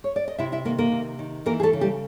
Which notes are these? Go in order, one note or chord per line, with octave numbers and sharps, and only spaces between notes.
C#5
D5
D#5
C3 E4 E5
E4 E5
D#3 A#3 A#4
A#3 A#4
C3
D#3
E3 A#3 A#4
G#4
A3 A4
C#3
G3 G4